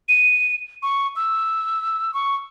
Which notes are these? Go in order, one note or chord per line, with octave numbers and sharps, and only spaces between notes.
D#7
C#6
E6
C#6